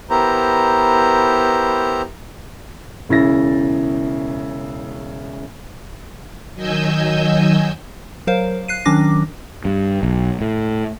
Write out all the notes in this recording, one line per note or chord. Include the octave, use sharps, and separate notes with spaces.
B3 E4 G4 A#4 C5 A#5
E1 C#3 E4 A6 A#6
D#3 F#3 D#5 G#5 E6 G6
F#3 A#4 C5 F5
F#6 C7 D#7
D#3 F#3 C#4 D4 D6 A#6
G2
B1
A2